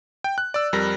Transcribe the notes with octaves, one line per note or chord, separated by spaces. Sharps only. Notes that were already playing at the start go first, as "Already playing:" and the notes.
G5
F#6
D5 E6
F2 G3 A#4 A#6